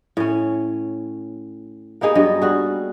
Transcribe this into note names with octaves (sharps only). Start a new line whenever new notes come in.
A2 C#4
A#3 B3 D#4 G#4
G2 F#3 G#4 D#5
G3 F#4 G#4